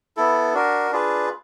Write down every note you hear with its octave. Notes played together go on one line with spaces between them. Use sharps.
B3 E4 A4
D4 F#4 A#4
D4 F4 G#4 B4